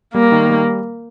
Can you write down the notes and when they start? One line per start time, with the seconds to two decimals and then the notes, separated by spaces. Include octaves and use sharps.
0.15 G3 A#3
0.32 D#3
0.49 G3